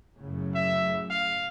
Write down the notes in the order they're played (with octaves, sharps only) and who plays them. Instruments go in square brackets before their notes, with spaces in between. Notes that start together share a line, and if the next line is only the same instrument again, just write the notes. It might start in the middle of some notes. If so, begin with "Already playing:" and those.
[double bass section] F#2 A2 C#3
[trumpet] E5
F5